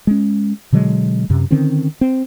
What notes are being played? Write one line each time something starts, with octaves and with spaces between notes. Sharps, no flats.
G#3 C#4
B2 D3 F#3 G#3
F#2 C3
D3 D#3 C4 C#4
C4